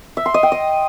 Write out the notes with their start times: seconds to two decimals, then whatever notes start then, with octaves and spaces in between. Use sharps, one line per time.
0.17 E5
0.26 C6
0.34 D#5
0.43 G5
0.52 D#5